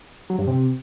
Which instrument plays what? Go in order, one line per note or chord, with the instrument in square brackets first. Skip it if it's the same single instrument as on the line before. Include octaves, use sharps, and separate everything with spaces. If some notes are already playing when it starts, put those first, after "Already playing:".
[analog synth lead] F#3
G2
C3